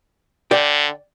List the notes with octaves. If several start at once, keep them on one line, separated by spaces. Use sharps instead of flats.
D3 D5 G5